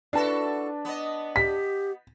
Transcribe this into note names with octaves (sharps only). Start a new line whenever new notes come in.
D4 E4 F#4 A4 B4 A5
B3 D#5
G4 B6